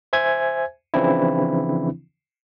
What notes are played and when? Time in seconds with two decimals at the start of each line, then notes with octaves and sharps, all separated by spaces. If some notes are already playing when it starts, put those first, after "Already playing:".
0.13 C5 E5 G#5 G#6
0.94 C#3 E3 F3 C4 D4 E4